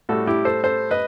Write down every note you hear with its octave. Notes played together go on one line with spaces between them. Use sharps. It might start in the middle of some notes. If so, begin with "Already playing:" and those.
A2 G3 F#4 A4
E4 G4
A4 C5
A4 C5
B4 D#5